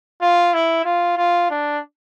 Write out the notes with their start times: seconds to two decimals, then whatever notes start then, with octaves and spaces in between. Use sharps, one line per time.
0.21 F4
0.53 E4
0.85 F4
1.17 F4
1.50 D4